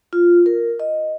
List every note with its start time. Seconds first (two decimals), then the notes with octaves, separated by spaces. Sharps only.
0.13 F4
0.46 A#4
0.80 D#5